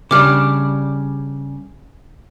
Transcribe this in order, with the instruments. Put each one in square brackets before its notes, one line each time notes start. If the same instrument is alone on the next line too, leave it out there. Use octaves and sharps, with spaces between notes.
[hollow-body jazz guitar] C#3 G3 D4 [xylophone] D6 F6